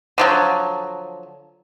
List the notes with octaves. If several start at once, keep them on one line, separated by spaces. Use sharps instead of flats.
D3 F3 F#3